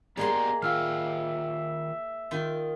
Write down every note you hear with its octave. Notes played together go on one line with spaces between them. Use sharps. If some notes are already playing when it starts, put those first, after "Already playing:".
G#3 A#3 B3 G4 D5 A#5 C6
D#3 F4 E5 F5 G5 E6 F6
D#3 F4